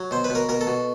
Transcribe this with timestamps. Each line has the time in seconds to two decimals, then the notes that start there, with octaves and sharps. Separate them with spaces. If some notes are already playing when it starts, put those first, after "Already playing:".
Already playing: F#3
0.11 B2 C5
0.24 B4
0.30 B2
0.35 A#4
0.49 B2 A#4
0.61 A4
0.67 B2